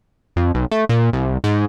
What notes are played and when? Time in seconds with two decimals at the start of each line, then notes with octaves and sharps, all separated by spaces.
0.36 F2
0.54 B1
0.71 A3
0.89 A#2
1.13 C2
1.44 G#2